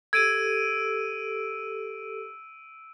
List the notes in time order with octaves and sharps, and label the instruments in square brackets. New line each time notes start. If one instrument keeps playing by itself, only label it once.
[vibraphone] G4 A4 [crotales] E6 D7 D#7 [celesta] G#6